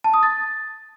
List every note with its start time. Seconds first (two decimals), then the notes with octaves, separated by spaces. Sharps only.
0.04 A5
0.14 D#6
0.23 A6